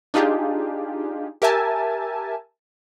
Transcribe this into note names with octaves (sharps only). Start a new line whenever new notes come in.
D4 D#4 F4 G4 G#4
G4 A#4 E5 G#5 A5